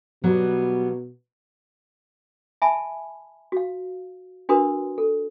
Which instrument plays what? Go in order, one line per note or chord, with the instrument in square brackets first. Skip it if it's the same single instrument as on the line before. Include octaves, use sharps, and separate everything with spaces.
[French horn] B2 [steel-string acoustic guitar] F#3 G3 B3
[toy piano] E5 G#5 A5 B5
F#4 F5
D4 F#4 A#4 B4 C6 D#6
A4